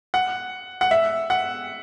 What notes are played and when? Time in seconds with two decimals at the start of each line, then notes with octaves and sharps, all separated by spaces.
0.14 F#5
0.81 F#5
0.91 E5
1.30 F#5